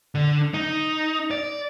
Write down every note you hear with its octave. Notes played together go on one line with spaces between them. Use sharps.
D3
D#4
D5